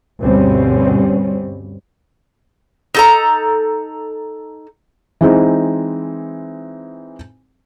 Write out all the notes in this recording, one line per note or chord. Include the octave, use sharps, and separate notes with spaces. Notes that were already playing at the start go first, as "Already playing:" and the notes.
D2 G2 B2 G3 C4 C#4
D#4 A4 A#5
E3 G#3 C4 D#4